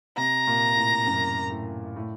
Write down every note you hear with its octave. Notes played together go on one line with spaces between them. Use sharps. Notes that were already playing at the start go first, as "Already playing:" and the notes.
C3 A#5
A#2
A2
F#2
A2
A2